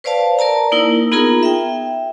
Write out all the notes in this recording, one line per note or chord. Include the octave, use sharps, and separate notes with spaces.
B4 C5 D5 F5 A5
A#4 D5 A5 A#5
A#3 D#4 E4 A#4
B3 D#4 F4 G#4 A#4 A#5
E5 G5